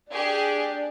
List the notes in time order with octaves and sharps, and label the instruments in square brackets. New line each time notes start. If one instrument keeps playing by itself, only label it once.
[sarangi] D4 [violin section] G4 G#4